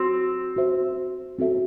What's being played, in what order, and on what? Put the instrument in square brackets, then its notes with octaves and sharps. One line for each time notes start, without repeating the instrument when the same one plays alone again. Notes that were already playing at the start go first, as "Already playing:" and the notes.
Already playing: [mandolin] C4 [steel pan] F#4 C5
[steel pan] F#4 C5 E5
C4 F#4 A4 E5